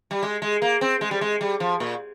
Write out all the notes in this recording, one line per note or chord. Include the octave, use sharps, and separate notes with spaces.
G3
G#3
G#3
A#3
C4
G#3
G3
G#3
G3
F3
A#2